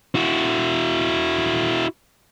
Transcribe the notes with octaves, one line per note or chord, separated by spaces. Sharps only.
E4 F#4